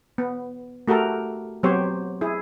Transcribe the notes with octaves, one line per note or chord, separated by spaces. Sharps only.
B3
A3 F#4 G4 A4 A#4
F#3 B3 C4 G4 C5 C#5
E4 G#4